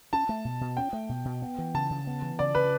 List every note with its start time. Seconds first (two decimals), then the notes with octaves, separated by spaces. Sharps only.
0.13 C#4 A5
0.29 A3
0.45 B2
0.61 B2
0.77 C#4 G5
0.93 A3
1.09 B2
1.25 B2
1.42 B3
1.58 E3
1.74 C#3 A5
1.90 C#3
2.07 B3
2.22 E3
2.39 C#3 D5
2.55 C#3 B4